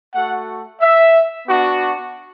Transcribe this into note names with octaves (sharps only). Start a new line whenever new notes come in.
A3 F#4 F#5
E5
B3 D4 F#4